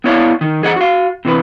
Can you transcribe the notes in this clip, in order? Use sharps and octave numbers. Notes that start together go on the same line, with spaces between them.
B3 E4 C#5 D5 F5 A5
D#3
E2 G#4 D#5 F#5
F#4 F5
C3 E3 E4 B4